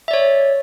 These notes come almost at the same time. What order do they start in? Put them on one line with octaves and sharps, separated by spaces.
E5 D5 C#5